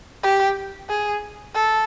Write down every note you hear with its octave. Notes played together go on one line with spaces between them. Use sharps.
G4
G#4
A4